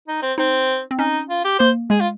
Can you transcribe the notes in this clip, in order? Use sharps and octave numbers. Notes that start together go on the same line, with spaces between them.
D#4
C4
C4 D#4
C4
C#4 D#4
F4
G4
A#3 C5
G#3 G#4
F4